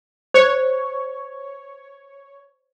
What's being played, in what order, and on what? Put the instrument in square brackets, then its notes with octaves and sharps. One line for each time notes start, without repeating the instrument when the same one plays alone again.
[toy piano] C5 [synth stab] C#5